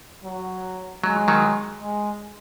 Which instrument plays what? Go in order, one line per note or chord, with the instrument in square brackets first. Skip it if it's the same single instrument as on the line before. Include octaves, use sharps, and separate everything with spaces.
[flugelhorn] F#3
[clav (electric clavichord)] F#3 [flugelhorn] G#3
[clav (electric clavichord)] D#3 F#3
[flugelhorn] G#3